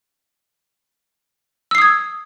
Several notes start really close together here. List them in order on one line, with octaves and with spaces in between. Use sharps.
E6 C7 D#6 G#6